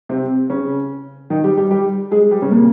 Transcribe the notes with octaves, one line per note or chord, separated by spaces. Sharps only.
C3 C4
C#3 C#4
D#3 D#4
G3 G4
G3 G4
G3 G4
G#3 G#4
G3 G4
C#3 C#4
A#2 A#3